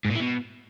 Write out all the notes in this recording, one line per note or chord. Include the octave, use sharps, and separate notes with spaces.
G#2
A#2
E3
B2